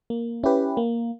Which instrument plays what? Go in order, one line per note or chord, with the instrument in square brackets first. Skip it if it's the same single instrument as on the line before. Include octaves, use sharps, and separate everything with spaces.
[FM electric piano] A#3
C#4 E4 G4 B4
A#3